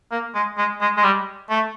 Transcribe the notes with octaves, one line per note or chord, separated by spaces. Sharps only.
A#3
G#3
G#3
G#3
G#3
G3
A3